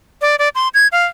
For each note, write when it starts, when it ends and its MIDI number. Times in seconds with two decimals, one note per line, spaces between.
0.22 0.36 74
0.39 0.49 74
0.55 0.68 84
0.74 0.87 92
0.92 1.05 77